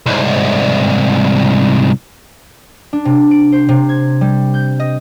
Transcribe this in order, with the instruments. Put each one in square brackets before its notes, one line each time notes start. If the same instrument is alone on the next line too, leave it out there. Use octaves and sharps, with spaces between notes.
[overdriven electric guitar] C2 G#2
[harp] D4
C3
D7
C5
C3
G#6
G3
G6
D#5